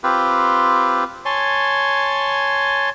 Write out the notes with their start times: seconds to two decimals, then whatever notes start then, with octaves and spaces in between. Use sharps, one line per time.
0.03 C4 F4 G4 B4
1.25 C#5 G#5 A5 C6